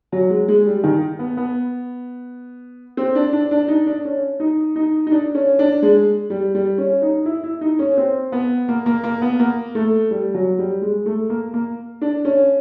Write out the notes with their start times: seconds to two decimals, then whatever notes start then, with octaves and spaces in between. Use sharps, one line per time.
0.12 F#3
0.30 G#3
0.48 G#3
0.66 G3
0.84 D#3
1.19 B3
1.37 B3
2.97 C4
3.15 D4
3.33 D4
3.51 D4
3.68 D#4
3.87 D4
4.05 C#4
4.40 D#4
4.76 D#4
5.07 D#4
5.11 D4
5.35 C#4
5.59 D4
5.82 G#3
6.30 G3
6.55 G3
6.78 C#4
7.02 D#4
7.26 E4
7.44 E4
7.61 D#4
7.79 C#4
7.97 C4
8.32 B3
8.68 A#3
8.86 A#3
9.04 A#3
9.22 B3
9.39 A#3
9.75 A3
10.11 G3
10.34 F#3
10.59 G3
10.82 G#3
11.06 A3
11.30 A#3
11.53 A#3
12.01 D4
12.25 C#4